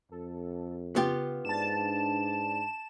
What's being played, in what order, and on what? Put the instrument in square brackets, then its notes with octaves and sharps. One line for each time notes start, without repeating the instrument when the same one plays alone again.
[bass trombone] F2 [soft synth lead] A4
[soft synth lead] C#3 [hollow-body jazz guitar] B3 F4 G4
[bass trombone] G#2 [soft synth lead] D4 [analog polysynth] A5 E7